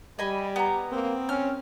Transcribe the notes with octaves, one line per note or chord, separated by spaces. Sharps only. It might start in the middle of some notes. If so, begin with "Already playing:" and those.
G3 D#5 G#5 B5
B3 G4 A#5
A#3 C4
C#4 F6